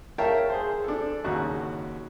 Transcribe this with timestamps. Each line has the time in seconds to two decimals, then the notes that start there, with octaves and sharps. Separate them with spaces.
0.18 A#4 C#5 E5 F5 G5 A5
0.49 G#4 C5
0.84 D4 A4
1.24 G#1 D#2 C#3 F#4 F#6